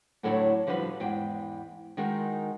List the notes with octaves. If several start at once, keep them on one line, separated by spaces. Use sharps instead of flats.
A2 D3 F#3 E4 A4 C#5
D3 F3 G3 F#4 B4
E2 G#2 G5
D#3 G#3 D#4 F#4 A#4